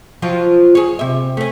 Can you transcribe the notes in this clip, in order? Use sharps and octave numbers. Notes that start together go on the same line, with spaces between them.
F3 F#3 F4
G#4 C#5
C3 E5
A3 C#4